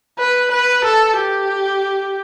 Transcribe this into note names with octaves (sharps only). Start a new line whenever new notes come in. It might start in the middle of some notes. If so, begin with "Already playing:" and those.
B4
B4
A4
G4